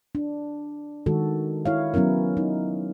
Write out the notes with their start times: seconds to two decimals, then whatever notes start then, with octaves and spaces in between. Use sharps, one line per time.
0.15 D4
1.06 D#3 G#3 F#4 A4
1.66 E4 C#5 F5
1.94 F#3 B3 C#4 E4 A#4
2.37 D#4